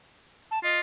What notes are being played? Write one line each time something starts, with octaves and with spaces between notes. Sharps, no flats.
A5
F4 D#5